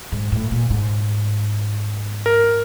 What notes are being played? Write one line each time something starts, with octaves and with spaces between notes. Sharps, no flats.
G#2
A2
A#2
G#2
A#4